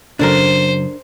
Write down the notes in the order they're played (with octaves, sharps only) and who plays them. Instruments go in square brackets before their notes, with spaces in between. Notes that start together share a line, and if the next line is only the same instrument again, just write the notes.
[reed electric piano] F#2 C#3 F#3 [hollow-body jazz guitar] D4 A4 A#4 [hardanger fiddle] C5